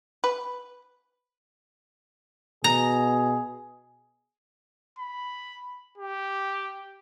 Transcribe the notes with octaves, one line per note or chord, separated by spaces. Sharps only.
B4
B2 G#4 A#5
B5
G4